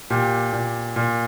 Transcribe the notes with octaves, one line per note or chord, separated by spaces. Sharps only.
A#2 G4
A#2
A#2